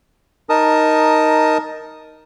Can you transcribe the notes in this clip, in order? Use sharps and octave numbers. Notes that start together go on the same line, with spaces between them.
D#4 A#4 A5 D#6